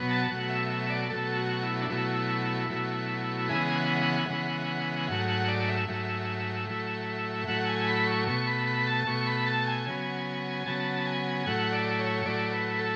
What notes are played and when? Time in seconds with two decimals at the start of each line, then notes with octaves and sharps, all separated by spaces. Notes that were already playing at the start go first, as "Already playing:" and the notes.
Already playing: B2 F#3 B3
0.10 A5
0.30 B2 F#3 A3 F#5
0.49 E5
0.70 E5
0.90 D5
1.09 B2 F#3 A3 A4
1.36 F#4
1.63 E4
1.82 D4
1.89 B2 F#3 A3 E4
2.69 B2 F#3 A3
3.48 C#3 E3 G#3 B3 G#4
3.75 F#5
4.02 F#5
4.28 C#3 E3 G#3 B3
5.08 G#2 F#3 A3 F#5
5.28 F#5
5.48 D5
5.68 E5
5.88 G#2 F#3 A3
6.67 A2 F#3 A3
7.47 A2 F#3 A3 F#5
7.67 G#5
7.87 B5
8.07 C#6
8.27 B2 A3 C#6
8.47 B5
8.67 B5
8.87 A5
9.07 B2 A3 C#6
9.27 B5
9.47 A5
9.67 G#5
9.86 C#3 F#3 B3
10.66 C#3 F#3 B3 A5
11.06 G#5
11.46 A2 F#3 A3 F#5
11.72 D5
11.99 C#5
12.25 A2 F#3 A3 D5
12.52 B4
12.79 A4